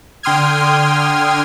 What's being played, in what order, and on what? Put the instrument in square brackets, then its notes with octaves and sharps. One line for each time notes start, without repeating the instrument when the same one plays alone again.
[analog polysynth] D3 G5 C6 D#6 F6 G#6